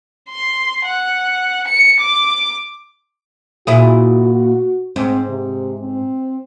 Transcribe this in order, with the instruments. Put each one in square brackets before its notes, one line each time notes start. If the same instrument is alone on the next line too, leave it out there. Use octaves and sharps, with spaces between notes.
[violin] C6
F#5
C#7
D6
[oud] A#2 E4 G#4 [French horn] F#4
[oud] G#2 [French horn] C4
[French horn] C3
C4